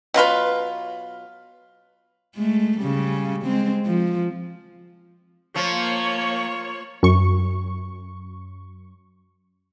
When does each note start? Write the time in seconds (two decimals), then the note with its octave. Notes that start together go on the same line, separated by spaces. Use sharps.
0.14 B2 F#3 F4 B4
2.35 G#3 A3
2.79 C#3 G3
3.43 G#3 C4
3.85 F3
5.56 F3 A#3 C#5
7.03 F#2 C#6